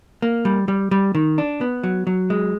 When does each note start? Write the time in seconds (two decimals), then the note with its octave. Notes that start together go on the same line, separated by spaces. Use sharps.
0.22 A#3
0.45 G3
0.68 G3
0.91 G3
1.15 D#3
1.38 D4
1.61 B3
1.83 F#3
2.07 F#3
2.30 G#3